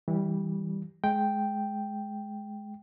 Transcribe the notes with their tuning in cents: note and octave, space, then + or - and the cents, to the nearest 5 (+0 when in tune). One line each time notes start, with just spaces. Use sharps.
E3 -25 G3 +0
G#3 +20 G5 +0